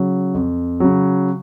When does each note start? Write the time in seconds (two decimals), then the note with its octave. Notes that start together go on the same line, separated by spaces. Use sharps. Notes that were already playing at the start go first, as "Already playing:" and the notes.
Already playing: C#3 F#3
0.34 F2
0.80 C#3 F#3